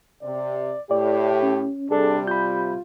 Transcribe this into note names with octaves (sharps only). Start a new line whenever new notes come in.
C3 D5
A2 G4 D5
C#4
C3 G3 D4 G#4 A4
F4 B5 G6